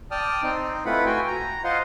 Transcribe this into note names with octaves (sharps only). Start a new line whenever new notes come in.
D5 G5 A5 D#6 F6
C4 D#4
A3 E4 F4 B4 F#5 B5
F#4 G5 G#5
A#5
F4 C5 D#5 F5 F#5 C6